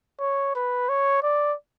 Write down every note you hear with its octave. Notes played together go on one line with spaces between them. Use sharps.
C#5
B4
C#5
D5